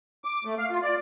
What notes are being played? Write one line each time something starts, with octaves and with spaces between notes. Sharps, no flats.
D6
A3
F5
F4
D5